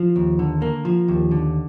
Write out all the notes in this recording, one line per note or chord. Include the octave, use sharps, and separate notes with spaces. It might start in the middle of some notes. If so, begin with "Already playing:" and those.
Already playing: F3
D#2
D3
A#3
F3
D#2
D3